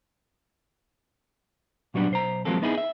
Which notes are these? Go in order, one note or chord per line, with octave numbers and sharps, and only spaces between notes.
A#2 F#3 G3 B3 D4
B1 C5 A#5
F3 F#3 G#3 A#3 C4 A4
B3 D#4 E4 F#4 G#4
E5